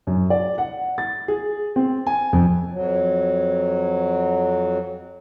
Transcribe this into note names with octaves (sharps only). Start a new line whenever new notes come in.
F#2
D5
F#5
A6
G#4
C4
G#5
F2
F2 F#3